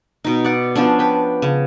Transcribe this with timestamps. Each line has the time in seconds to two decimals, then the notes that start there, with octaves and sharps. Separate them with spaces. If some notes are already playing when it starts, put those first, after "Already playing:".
0.24 B2 D#4
0.44 D5 F#5
0.75 F3 B3 C#4 D4
0.99 B4 G5
1.42 C#3